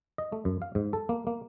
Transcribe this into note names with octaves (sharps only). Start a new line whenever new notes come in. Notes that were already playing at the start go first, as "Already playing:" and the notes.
D#5
A3
F#2
F5
G#2
A4
A#3
A#3